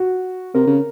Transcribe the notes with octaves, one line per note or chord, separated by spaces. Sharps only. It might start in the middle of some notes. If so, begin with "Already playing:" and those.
Already playing: F#4
C3 A#4
C#3